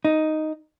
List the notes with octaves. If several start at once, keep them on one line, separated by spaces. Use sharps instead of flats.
D#4